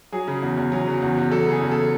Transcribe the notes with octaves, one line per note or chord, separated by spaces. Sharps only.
F#3 G#4
C#3
E2
E2
F#3
C#3
E2
E2
F#3 A4
C#3
G#4
E2
A4